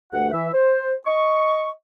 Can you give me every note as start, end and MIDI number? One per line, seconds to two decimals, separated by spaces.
0.13 0.31 38
0.13 0.31 43
0.13 0.31 57
0.13 0.31 78
0.32 0.50 52
0.32 0.50 76
0.53 0.94 72
1.06 1.70 75
1.06 1.70 85